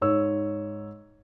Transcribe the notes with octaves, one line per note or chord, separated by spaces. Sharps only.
G#2 C#5 E6